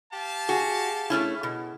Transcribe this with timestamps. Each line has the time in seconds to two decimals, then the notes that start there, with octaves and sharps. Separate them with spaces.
0.14 G4 F5 A5
0.49 F#4 G#4
1.10 A3 C#4 E4
1.43 B2